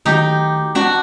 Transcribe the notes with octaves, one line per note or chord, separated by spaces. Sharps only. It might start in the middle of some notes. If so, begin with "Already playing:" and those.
D#3 F#3 A3 D#4 G4
D4 F#4